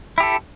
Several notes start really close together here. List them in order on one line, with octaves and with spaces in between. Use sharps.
E4 G4 A4